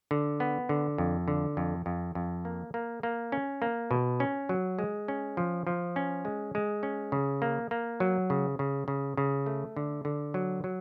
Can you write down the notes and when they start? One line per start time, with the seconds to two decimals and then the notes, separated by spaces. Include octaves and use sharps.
0.11 D3
0.40 B3
0.69 D3
0.98 F2
1.28 D3
1.57 F2
1.86 F2
2.15 F2
2.45 A#3
2.74 A#3
3.03 A#3
3.32 C#4
3.62 A#3
3.91 B2
4.20 C#4
4.49 F#3
4.79 G#3
5.08 C#4
5.37 F3
5.67 F3
5.96 C#4
6.25 G#3
6.55 G#3
6.83 C#4
7.12 C#3
7.42 A#3
7.71 A#3
8.00 F#3
8.30 C#3
8.59 C#3
8.88 C#3
9.17 C#3
9.46 A3
9.76 D3
10.05 D3
10.34 F#3
10.64 F#3